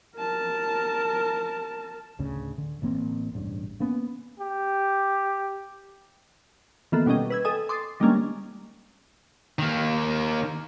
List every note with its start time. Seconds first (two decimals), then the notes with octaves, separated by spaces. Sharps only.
0.16 A#4 A5
2.19 A1 D2 A2 C#3
2.58 D3
2.82 A1 E3 A#3 C4
3.33 E1 A1 G2
3.80 A#3 B3 C#4
4.39 G4
6.92 D#3 E3 A#3 B3 F4 A4
7.06 B2 G3 C#4 D#5 G5
7.30 B4 E6 G#6
7.45 A4 D#5 G5 G#5 D#6
7.69 C6 D6 D#6 A6 C7
8.00 D#3 G3 G#3 A#3 C#4 D4
9.59 D#3 A#3